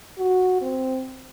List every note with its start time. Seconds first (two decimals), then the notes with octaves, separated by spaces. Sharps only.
0.18 F#4
0.62 C4